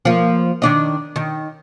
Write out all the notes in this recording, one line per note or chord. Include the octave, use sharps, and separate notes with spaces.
F3 A#3
D#3 D4 D#5
D#3